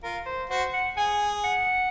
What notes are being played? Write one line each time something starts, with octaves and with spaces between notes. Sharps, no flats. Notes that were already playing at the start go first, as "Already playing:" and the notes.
F4 A#4
C5
F#4 C5
F#5
G#4 G#5
F#5